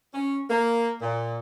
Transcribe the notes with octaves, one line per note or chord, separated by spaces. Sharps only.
C#4
A#3
A#2